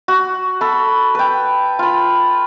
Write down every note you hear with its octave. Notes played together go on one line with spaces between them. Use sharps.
F#4
A4 B5
B4 G5
F4 B5